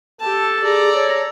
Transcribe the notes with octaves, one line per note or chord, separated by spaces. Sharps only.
G4 A4 A5
G#4 D5 A#5
C#5